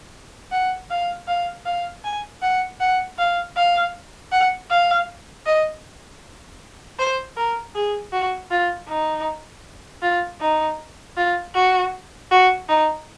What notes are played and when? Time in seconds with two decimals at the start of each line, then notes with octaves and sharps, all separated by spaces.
0.52 F#5
0.90 F5
1.28 F5
1.65 F5
2.04 G#5
2.42 F#5
2.80 F#5
3.18 F5
3.57 F5
4.32 F#5
4.70 F5
5.46 D#5
6.99 C5
7.37 A#4
7.75 G#4
8.13 F#4
8.51 F4
8.88 D#4
10.02 F4
10.41 D#4
11.17 F4
11.55 F#4
12.31 F#4
12.69 D#4